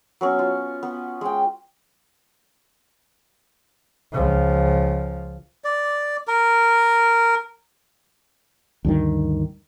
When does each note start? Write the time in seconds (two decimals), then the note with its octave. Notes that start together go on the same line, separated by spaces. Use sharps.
0.21 F#3 B3 C#4
0.39 F4
0.83 B3
1.21 G#3 G5
4.12 C#2 F3
5.64 D5
6.27 A#4
8.85 D2 G2 D#3